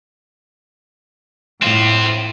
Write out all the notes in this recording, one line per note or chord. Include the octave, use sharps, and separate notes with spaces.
A2 C4 F4